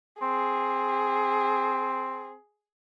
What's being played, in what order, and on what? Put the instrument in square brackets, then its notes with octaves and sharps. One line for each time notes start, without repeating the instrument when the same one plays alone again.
[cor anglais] C4 [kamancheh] G#4